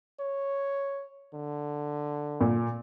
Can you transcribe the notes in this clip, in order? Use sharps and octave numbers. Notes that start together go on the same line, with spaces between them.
C#5
D3
A#2